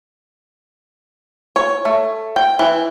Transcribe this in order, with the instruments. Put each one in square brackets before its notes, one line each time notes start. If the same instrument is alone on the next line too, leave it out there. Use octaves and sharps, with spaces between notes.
[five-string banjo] C#5
A3
G5
E3